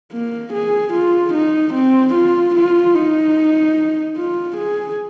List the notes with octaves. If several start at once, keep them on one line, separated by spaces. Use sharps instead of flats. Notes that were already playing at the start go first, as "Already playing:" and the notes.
A#3
G#4
F4
D#4
C4
F4
F4
D#4
F4
G#4